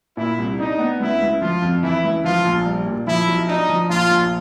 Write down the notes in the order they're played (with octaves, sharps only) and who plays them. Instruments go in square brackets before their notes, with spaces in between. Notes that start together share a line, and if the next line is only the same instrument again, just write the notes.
[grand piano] A#2 [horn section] E4
[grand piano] C2
[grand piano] D4 [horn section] D#4
[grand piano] B3
[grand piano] C#2 [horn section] E4
[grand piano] C#2
[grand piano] F3 [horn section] F4
[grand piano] F2
[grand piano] E3 [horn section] E4
[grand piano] C#2
[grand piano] F3 [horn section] F4
[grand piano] A#1
G3
A#2
[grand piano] F3 [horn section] E4
[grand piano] B1
[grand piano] D4 [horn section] D#4
[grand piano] F3
[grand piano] A#1 [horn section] F4
[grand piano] A#1